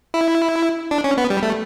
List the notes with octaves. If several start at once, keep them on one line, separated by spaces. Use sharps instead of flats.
E4
D4
C#4
B3
G3
A3